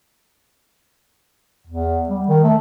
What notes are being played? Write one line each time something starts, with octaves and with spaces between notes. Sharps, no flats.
E2
G3
D#3
A3